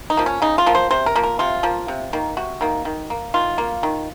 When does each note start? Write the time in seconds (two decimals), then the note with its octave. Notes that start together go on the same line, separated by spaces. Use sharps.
0.10 D#4
0.17 F3 A#3
0.26 C#4
0.42 C#3 D#4
0.58 F4
0.66 F3 A#3
0.75 C5
0.91 C3 C5
1.06 A#4
1.16 F3 A#3
1.23 A#4
1.39 C3 F4
1.63 F3 A#3
1.88 C3
2.13 D#3 A#3
2.37 C3 F#4
2.61 D#3 A#3
2.85 D#3
3.10 A#3
3.34 D#3 F4
3.58 A#3
3.83 D#3